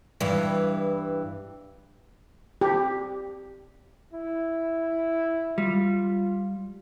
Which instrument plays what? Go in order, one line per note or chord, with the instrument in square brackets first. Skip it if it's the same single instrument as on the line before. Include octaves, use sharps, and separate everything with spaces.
[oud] G2 E3
[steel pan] G4
[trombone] E4
[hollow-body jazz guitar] G3 [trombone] F4